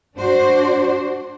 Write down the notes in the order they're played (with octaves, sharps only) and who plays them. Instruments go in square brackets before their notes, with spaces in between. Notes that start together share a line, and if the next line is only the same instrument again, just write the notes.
[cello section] D4 F#4 C5